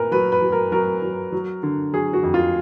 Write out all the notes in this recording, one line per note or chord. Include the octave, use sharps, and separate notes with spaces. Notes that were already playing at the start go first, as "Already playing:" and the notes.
Already playing: A#2 A#4 B4
F#3 B4
B4
F#3
A#4
F#3 A#4
F#3
F#3
D3
F#3 G#4
F#4
F2
F4